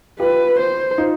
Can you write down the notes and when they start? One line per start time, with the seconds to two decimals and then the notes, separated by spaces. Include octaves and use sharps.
0.20 F4 G4 B4
0.60 C5
0.98 D#4 F4